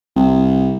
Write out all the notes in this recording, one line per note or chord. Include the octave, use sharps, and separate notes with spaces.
C2